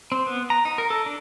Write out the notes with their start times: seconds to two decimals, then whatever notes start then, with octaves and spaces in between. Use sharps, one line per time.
0.12 C4
0.26 B3
0.50 A#5
0.65 D#4
0.78 A#4
0.90 A4
1.06 D4